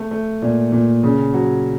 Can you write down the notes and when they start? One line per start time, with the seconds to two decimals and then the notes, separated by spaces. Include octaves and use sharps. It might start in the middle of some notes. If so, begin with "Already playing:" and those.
Already playing: A3
0.11 A3
0.42 A#2
0.72 A#2
1.03 C#3
1.34 F#3